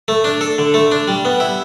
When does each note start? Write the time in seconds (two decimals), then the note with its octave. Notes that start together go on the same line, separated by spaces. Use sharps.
0.08 A3
0.24 D4
0.41 A4
0.58 D3
0.74 A3
0.91 D4
1.08 G3
1.25 B3
1.40 E4